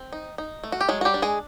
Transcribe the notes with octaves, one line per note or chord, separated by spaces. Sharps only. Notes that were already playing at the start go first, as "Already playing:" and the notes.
Already playing: C4
D#4
D#4
A3
F#4
G4
F#3 G#3 G#4
F#4
G3 G4
D4
G#3 G#4